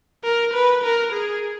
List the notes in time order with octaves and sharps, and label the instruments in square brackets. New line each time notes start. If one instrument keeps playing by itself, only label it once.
[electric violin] A#4
B4
A#4
G#4